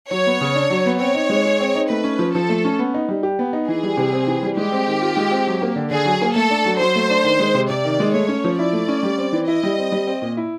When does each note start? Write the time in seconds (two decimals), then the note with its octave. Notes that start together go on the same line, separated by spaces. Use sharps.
0.11 F#3 C#5
0.27 B3
0.41 C#3
0.56 D4
0.70 F#3
0.86 B3
1.00 C4 C#5
1.15 D#4
1.30 G#3
1.46 G#4
1.60 C4
1.75 D#4
1.90 A3 B4
2.04 C#4
2.19 F3
2.34 F3 A4
2.49 A3
2.65 C#4
2.79 B3
2.94 D#4
3.09 G3
3.23 G4
3.39 B3
3.53 D#4
3.68 E3 G#4
3.83 G3
3.97 C3
4.13 C4
4.27 E3
4.43 G3
4.57 G#3 G4
4.72 C4
4.87 D#3
5.01 F4
5.17 G#3
5.31 C4
5.47 F#3
5.62 A#3
5.76 D3
5.91 D3 G#4
6.05 F#3
6.21 A#3
6.35 A3 A4
6.50 D4
6.65 F#3
6.80 F#3 C5
6.96 A3
7.10 D4
7.24 D#3
7.40 G#3
7.54 C3
7.70 C3 D5
7.85 D#3
8.00 G#3
8.14 A3 C#5
8.28 C#4
8.44 F3
8.59 E4 D5
8.73 A3
8.88 C#4
9.03 G3
9.18 C4
9.33 E3
9.48 E4 D#5
9.63 G3
9.78 C4
9.92 G3
10.07 C4
10.22 A#2
10.37 E4